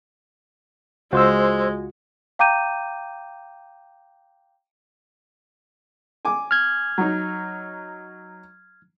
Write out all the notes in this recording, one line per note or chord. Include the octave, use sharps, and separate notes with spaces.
C#2 G#3 F4 F#4 C5 C6 E6
F5 G5 A#5 D6 G6 D#7
G#5 D6
F6 G#6
F#3 D#4